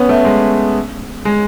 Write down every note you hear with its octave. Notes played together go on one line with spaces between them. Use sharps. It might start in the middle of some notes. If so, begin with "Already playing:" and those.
Already playing: B3 C#4
A3
G#3
G#3